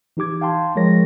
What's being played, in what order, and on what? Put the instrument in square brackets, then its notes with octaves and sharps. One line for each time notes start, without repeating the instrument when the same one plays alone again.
[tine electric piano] E3 D#4 G4 D6 G#6
F5 G5 A5 C6
F3 G#3 A#4 C#5 A#6